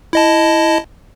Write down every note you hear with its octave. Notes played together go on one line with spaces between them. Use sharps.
E4 D#5 A5